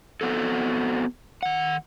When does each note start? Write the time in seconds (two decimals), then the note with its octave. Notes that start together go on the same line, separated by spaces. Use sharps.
0.21 B3 C4 F#4 A4
1.43 D#3 F#5